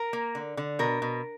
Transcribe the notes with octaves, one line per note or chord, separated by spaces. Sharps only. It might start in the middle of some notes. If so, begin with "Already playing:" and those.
Already playing: A#4
A#3
D3
D3
B2 A#4
B2